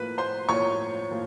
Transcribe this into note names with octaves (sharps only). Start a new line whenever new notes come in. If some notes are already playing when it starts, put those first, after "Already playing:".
Already playing: A2 F3 A#3 B4 B5
C5 C6
A2 F3 A#3 C#5 C#6
A2 F3 A#3